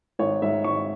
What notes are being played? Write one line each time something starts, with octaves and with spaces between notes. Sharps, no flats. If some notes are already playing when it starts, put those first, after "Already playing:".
G#1 C#5
G#2 G#3 E5
G#1 C#6